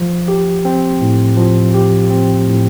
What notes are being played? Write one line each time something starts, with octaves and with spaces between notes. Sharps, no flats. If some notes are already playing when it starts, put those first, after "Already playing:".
Already playing: F3
G4
C4
A2
F3
G4
C4
A2